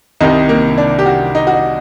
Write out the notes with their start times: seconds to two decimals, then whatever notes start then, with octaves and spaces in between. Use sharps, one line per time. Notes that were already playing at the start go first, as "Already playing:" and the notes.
0.21 C2 C3 D#3 D#4
0.49 A#3
0.78 D4
0.99 G4
1.06 F#4
1.35 D#4
1.47 F#4
1.54 D#4